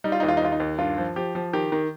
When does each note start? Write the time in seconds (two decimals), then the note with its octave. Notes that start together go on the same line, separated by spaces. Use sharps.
0.04 G3 D#4
0.12 F4
0.20 D#2 D#4
0.28 F4
0.37 D#4
0.42 D#2 F4
0.52 D#4
0.60 D#2
0.78 G2 F4
0.98 F3
1.16 F3 G4
1.35 F3
1.53 D#3 G4
1.72 D#3